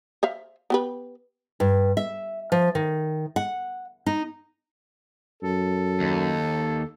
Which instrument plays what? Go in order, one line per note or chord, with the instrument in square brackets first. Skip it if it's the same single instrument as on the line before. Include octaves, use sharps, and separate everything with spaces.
[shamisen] C5 E5 F5
B3 G4 B4
[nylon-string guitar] G2
E5
F3
D#3
F#5
D#4
[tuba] F#2 [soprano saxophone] A4
[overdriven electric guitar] D#2